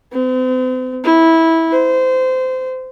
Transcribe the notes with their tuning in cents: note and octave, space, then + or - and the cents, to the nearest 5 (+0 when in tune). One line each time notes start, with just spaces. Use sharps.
C4 -40
E4 -15
C5 -20